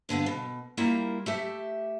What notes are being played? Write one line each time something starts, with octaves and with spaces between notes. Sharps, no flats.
G2 D3 B3 F5
B2
G3 A#3 E4 F4 A#4 G5
A3 G4 E5